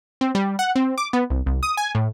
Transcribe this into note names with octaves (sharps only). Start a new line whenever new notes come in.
C4
G3
F#5
C4
D6
B3
C2
C2
D#6
G#5
A2